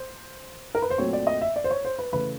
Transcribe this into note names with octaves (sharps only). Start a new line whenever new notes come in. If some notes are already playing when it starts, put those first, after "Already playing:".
Already playing: C5
A#4
B4
C5
A#2 F#3 A3 C4 C#5
D5
D#5
E5
D5
C5
C#5
C5
B4
C#3 E3 A3 B4